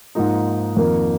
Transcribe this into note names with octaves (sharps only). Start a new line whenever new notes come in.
G#2 F3 A#3 D#4
F2 D#3 A#3